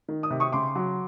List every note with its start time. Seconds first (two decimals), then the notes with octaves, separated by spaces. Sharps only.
0.08 D#3
0.23 D#6
0.30 C3
0.40 C#6 D#6
0.52 C#3 C6 D6
0.75 F#3